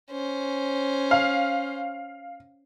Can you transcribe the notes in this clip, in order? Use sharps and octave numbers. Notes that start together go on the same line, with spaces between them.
C#4 C5
F5